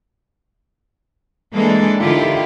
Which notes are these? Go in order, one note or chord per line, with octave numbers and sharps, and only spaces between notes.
E3 G#3 A#3 D4 A4
D3 D#3 E4 F4 G4